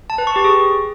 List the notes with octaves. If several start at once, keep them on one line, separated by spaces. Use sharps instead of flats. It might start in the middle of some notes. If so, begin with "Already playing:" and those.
A5
B4
C#6
G4
G#4